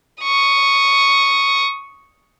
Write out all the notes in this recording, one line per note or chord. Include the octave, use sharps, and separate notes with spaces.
C#6 D#6